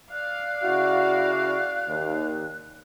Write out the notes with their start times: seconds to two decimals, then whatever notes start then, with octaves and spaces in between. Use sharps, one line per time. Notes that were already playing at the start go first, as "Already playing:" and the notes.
0.11 D5 F5 F#6
0.63 C#3 E4 F#4
1.87 D#2